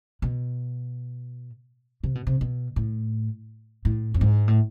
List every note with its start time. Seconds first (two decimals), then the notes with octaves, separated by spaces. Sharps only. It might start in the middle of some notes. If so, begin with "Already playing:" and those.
0.22 B2
2.04 C3
2.15 B2
2.27 C3
2.41 B2
2.76 A2
3.85 A2
4.14 F2
4.21 G#2
4.48 A2